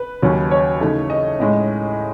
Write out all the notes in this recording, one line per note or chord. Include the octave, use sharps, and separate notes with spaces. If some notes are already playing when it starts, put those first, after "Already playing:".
Already playing: B4
D#2 C#3 F#3 C#4
C#5
C#3 E3 A3 D#4
D#5
A2 G#3 C#4